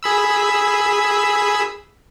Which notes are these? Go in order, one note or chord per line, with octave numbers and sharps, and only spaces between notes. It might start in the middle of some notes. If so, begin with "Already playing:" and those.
G#4 B5 E6